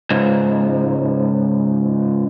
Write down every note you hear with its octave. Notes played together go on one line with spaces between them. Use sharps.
C#2 G#2